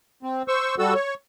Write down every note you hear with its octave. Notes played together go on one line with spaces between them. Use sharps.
C4
C5 C#6 E6
G3 F#4 A4 E6
C#5